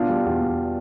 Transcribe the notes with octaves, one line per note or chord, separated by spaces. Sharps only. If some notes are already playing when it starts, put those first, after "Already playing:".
Already playing: B2 D4 F4
G3
E2
E2